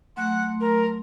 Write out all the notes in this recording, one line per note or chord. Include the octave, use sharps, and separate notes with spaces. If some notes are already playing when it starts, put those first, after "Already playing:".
F#3 A3 F#5 C6
A#4